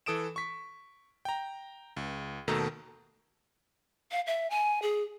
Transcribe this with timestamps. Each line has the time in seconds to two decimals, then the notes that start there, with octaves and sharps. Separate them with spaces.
0.06 E3 A4 D#6 D7 E7
0.36 C#6 B6
1.25 G5 A#5
1.97 C#2
2.48 D#2 B2 D#3 A3 A4 A#5
4.11 F5
4.27 E5
4.50 G#5
4.82 G#4